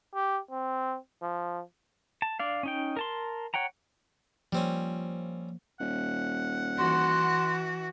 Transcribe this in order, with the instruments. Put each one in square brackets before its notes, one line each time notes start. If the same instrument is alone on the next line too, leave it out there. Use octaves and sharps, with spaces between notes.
[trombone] G4
C4
F3
[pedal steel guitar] A5
D4 D5 F5
C#4 D#4 G5
A#4 A5 C6
C#5 F#5 G5 A#5
[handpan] F3 A#3 [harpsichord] G3 C4 C#4
[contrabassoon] D#1 [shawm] F#5
[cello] E3 F#4 [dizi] C6